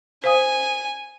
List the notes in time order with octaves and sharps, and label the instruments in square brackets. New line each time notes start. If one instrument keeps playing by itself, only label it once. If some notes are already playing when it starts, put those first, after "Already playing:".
[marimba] C5 F5 D#6 [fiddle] G#5